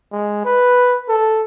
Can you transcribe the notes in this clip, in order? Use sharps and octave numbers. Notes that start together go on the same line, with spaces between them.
G#3
B4
A4